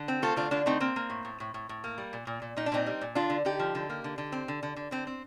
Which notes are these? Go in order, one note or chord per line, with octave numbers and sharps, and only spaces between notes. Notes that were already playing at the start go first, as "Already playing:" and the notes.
Already playing: D3
C4
A3 F4 A4
D3 D4 F4
D3 D4 F4
A3 C4 D#4
A#3 C4
A#3
A2
A2
A2
A2
A2
A#3
G3
A#2
A#2
A#2
A#2 D#4
D4
A#2 C4 D#4
G3
A#2
D3 D4 F4
D3
D3 D#4 G4
F3
D3
A#3
D3
D3
C4
D3
D3
D3
D3 C4
C4